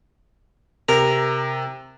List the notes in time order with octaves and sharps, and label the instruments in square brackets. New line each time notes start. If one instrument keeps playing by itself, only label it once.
[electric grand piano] C3 [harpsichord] A#4